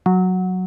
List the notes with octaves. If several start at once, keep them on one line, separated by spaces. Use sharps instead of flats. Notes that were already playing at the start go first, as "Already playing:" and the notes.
F#3